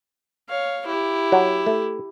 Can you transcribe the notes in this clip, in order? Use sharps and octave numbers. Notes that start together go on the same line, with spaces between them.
C#5 F5
E4 G4
F#3
A3